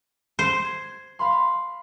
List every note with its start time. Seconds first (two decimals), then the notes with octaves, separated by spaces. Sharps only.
0.39 C5
0.64 G#6
1.19 F5 B5 C6